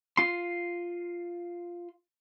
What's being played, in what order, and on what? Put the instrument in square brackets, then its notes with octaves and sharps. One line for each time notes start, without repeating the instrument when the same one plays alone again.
[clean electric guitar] F4 C6